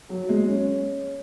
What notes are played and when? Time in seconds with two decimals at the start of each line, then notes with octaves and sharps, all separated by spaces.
0.09 F#3
0.29 G#3
0.48 C#4